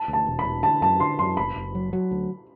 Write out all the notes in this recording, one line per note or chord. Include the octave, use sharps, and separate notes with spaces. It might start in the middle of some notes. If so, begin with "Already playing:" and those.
Already playing: A5
D2
A5
E1
B5
E1
D3 A5
F#2 A5
D3 C6
F#2 C6
F#1 B5
F#1
F#3
F#3
D2